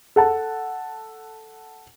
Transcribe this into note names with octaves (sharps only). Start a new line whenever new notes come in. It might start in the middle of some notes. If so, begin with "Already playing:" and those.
A4 F#5 A5